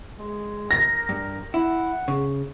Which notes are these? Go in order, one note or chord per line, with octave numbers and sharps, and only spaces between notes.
G#3
A#4 A#6
G2
E4 F#5
C#3